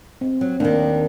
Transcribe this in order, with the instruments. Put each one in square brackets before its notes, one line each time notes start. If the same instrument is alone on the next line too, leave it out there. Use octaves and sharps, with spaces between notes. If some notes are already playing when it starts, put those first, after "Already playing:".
[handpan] C4
[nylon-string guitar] F#3
[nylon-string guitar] D#2 D#3 [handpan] D4